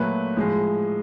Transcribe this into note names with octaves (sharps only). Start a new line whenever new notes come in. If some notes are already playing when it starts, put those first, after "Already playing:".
Already playing: A#2 F#3 A3 B4
A2 F3 G#3